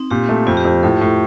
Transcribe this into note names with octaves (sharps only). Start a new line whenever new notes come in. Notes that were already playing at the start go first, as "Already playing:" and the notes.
Already playing: C4 D#4
A#2 G4
A3
F2 F4
G4
F2 F4
A2 A4
A2